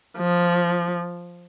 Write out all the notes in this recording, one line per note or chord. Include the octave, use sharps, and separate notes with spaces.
F3